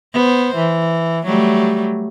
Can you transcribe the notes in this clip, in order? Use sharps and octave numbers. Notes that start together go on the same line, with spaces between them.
B3 C5
E3
F#3 G3 A3